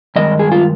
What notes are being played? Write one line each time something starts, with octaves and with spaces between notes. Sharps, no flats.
G2 D#3 G#3 D#5
G#4
F4